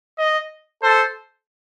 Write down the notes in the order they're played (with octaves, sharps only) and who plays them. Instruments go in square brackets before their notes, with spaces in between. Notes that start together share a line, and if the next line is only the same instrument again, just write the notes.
[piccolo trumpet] D#5
[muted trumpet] A4 [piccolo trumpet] C5